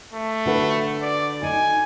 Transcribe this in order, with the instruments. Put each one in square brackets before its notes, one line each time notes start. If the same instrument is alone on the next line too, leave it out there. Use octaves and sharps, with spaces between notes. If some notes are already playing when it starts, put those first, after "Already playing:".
[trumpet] A3
[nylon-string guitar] D3 F#4 B4
[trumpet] D5
[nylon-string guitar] D#4 [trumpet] G#5